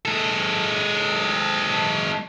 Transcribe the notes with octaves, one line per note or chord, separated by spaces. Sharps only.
G#3 A4